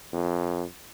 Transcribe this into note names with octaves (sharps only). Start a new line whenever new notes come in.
F2